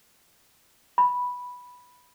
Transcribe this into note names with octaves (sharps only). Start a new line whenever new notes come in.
B5